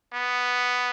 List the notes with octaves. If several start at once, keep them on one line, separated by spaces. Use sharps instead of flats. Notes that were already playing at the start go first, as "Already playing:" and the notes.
B3